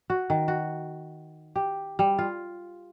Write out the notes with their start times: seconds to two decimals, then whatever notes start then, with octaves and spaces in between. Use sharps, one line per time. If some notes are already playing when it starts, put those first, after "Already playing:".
0.10 F#4
0.30 D#3
0.48 F#4
1.56 G4
1.99 G3
2.19 F4